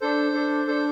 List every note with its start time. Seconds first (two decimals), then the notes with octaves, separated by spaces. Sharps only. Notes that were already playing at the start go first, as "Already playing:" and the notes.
0.01 D4 A4 C5
0.34 D4 A4
0.67 D4 A4 C5